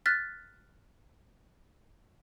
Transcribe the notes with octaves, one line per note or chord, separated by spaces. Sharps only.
F6 F#6 A6 B6